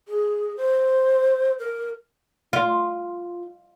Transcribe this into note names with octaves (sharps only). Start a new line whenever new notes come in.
G#4
C5
A#4
F4